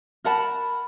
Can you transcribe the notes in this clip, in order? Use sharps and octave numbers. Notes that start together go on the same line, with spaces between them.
A#4 F#5 A5 B5